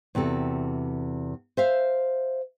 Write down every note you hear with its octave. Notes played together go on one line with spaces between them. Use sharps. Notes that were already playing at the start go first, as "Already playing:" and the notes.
E2 C3 F#4 A4
C5 E5 F5